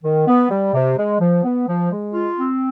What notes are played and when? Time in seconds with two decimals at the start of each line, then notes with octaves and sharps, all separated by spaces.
0.04 D#3
0.27 B3
0.50 G3
0.74 C3
0.97 G#3
1.20 F3
1.43 B3
1.67 F3
1.91 G#3
2.14 F4
2.38 C4